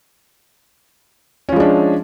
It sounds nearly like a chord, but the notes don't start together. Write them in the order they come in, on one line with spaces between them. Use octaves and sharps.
C#4 F3 G#3 D4